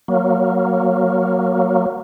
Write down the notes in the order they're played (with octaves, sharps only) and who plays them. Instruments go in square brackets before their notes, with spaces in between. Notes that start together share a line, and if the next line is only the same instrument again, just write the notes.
[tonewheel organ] F#3 A#3